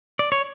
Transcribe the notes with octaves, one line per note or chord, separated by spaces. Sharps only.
D5
C#5